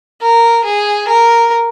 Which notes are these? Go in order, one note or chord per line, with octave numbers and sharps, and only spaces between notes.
A#4
G#4
A#4